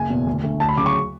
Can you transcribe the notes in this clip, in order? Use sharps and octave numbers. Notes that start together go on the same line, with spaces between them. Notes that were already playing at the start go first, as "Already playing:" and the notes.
Already playing: F#1 G#5
E2 B2
D2
D3 A3
D2 A5
B5
C#3 F#3 D6
C#6